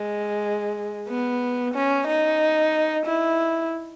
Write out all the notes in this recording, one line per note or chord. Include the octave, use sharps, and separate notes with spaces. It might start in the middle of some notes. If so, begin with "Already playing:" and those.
Already playing: G#3
B3
C#4
D#4
E4